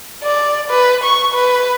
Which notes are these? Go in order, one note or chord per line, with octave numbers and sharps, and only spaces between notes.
D5
B4
C#6
B4